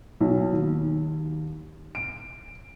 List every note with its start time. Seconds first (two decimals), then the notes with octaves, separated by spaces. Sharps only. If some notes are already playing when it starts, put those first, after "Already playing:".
0.20 B1
0.53 D#2
1.95 D7